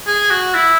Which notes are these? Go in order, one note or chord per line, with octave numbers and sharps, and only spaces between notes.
G#4
F#4
E4